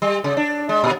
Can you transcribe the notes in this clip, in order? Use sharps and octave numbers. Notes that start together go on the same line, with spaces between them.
G3
C#3
D4
G#3
A#2